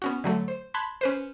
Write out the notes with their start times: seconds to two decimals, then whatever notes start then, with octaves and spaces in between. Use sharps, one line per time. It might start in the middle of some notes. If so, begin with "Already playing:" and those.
0.02 B3 C#4 F#4
0.24 D3 F#3 A3
0.48 C5
0.74 A5 B5 C6 F#6 G#6 B6
1.01 C#4 B4 C5